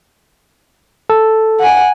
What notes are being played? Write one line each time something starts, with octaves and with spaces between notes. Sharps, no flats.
A4
F#5 G#5